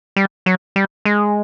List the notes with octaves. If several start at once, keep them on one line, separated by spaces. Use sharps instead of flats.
G3
F#3
G3
G#3